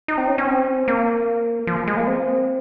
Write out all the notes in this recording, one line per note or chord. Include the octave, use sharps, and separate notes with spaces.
D#4
C4
C#4
C#4
C4
A#3
F3
G#3
A#3
C4